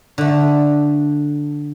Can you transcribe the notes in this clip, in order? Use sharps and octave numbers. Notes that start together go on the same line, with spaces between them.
D3 A3